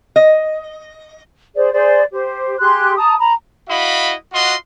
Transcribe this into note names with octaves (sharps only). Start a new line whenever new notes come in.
D#5
G#4 C5 D5
G#4 C5 D5
G4 C5
G4 G#4 C6 F#6
A5 A#5 D#6
A#5 B5
E4 F#4 D#5 F5 B5
F4 F#4 D#5 F#5 C6